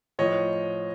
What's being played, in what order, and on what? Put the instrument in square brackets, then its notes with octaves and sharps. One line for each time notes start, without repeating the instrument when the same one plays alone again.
[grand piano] A2 F3 C#5 D#5